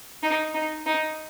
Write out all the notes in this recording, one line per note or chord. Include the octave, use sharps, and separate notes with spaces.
D#4
D#4
D#4